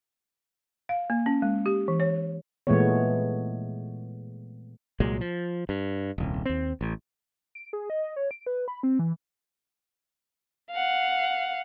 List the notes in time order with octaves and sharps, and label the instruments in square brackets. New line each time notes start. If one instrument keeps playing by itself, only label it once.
[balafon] F5
A#3
C#4
G#3
G4
E3
C#5
[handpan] A#2 E3 G#3 A3 B3 C#5
[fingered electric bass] C2 A#2 F#3 G#3
F3
G2
D#1 C2
D#2 C4
A1
[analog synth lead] D7
G#4
D#5
C#5
D7
B4
B5
C4
E3
[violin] F5 F#5